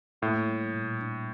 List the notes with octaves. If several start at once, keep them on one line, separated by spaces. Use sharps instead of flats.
A2 A#3
G3
A#2
D4